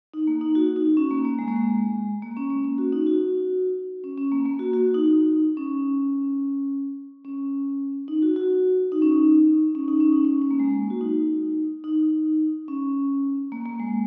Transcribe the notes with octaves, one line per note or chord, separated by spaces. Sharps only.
D#4
A#3
D#4
F#4
D#4
C#4
A#3
A#3
G#3
A#3
G#3
A#3
C#4
A#3
C#4
F#4
D#4
F#4
C#4
C#4
A#3
A#3
F#4
F#4
D#4
C#4
C#4
D#4
F#4
F#4
D#4
C#4
D#4
C#4
D#4
C#4
D#4
C#4
C#4
A#3
G#3
A#3
F#4
D#4
D#4
C#4
A#3
A#3
G#3